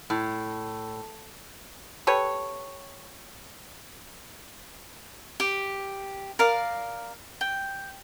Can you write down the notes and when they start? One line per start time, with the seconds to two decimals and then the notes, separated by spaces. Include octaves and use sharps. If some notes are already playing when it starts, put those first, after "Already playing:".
0.10 A2
2.07 G4 A4 B4 C#5
5.40 G4
6.39 A#4 D5 F5
7.41 G5